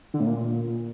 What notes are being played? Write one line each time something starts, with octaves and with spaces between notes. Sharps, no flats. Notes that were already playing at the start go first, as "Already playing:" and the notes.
D3
A2
A#2